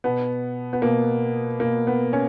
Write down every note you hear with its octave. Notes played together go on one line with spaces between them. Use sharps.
B2 B3
B3
B2 A#3
B2 A#3
B3
C#4